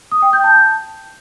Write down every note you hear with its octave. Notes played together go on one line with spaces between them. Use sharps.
D#6
G5
G6
A5